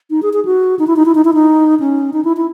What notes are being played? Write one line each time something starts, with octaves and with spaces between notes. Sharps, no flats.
D#4
G#4
G#4
F#4
D#4
E4
D#4
E4
D#4
E4
D#4
C#4
D#4
E4
E4